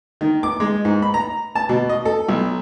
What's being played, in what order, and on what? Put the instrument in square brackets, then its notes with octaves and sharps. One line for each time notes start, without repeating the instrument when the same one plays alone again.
[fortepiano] D#3
D6
G#3
G#2
B5
A#5
A5
B2
D#5
A4
B1